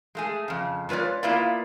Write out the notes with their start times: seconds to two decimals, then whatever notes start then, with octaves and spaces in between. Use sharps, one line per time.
0.15 G#3 A3 G#4
0.48 F2 C#3
0.89 G#3 F4 B4 C#5 D5
1.23 A#3 B3 E4 F4 B4 D5